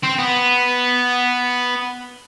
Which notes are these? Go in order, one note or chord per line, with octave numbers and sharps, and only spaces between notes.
C4
B3